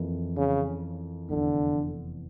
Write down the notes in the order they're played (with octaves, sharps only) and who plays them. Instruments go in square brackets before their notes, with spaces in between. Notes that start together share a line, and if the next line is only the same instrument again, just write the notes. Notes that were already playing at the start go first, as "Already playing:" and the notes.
Already playing: [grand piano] F2 E3 A#3
[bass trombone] C#3
[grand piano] F1 E2 E3 [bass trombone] D3